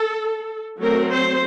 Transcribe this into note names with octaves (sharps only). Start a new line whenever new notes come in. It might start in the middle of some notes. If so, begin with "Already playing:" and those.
Already playing: A4
F#3 A3 C4 A#4
C5